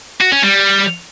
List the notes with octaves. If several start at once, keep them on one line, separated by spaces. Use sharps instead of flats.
F#4
C#4
G3